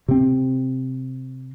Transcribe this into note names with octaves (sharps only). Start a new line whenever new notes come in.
C3 C4